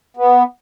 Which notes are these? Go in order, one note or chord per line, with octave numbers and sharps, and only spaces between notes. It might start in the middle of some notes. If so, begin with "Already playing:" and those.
B3